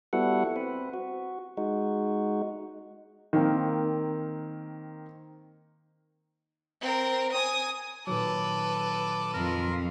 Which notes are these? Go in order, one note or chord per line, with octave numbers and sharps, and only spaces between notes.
G3 B3 E4 F#4 A4 F#5
C4 B4
F#4
G#3 D#4 F#4
D#3 A#3 C4
C4 A#4
G#5 D#6
A#2 D#3 F#3 A4 B4 D6
F2 F3 A#4